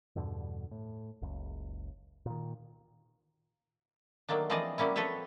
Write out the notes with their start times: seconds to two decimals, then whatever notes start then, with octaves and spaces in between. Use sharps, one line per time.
0.16 E2 G2 B2 D3
0.71 A2
1.22 F#1 C#2
2.26 A#2 D#3
4.29 D#3 F#3 A3 A#3 D4
4.50 E3 F3 C4 G#4 D5 D#5
4.78 F#3 G3 A#3 C#4 E4
4.96 F3 C4 A4 B4 C#5 E5